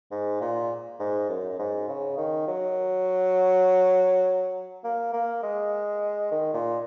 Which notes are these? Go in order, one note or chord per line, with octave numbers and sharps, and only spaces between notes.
G#2
A#2
G#2
F#2
G#2
C#3
D#3
F#3
A#3
A#3
G#3
D#3
A#2